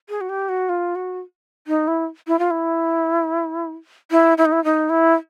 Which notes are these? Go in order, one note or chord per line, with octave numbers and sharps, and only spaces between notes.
G#4
F#4
G4
F#4
F4
F#4
D#4
E4
E4
F4
E4
E4
E4
D#4
E4
D#4
E4